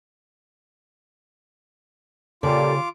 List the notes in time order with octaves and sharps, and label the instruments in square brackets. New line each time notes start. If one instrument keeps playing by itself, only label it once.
[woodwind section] A#2 G3 [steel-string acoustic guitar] C#3 F5 [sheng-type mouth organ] F4 D6 [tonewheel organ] A4